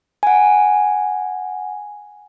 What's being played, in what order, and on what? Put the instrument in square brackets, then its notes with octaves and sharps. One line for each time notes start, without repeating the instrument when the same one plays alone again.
[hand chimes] F#5 G#5